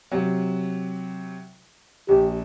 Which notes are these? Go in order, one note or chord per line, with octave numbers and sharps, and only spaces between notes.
C3 F#3
A#1 G4